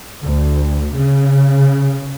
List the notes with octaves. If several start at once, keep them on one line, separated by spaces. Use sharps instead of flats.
D2
C#3